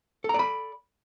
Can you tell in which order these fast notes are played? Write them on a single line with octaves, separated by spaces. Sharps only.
A4 A#5 D5 B5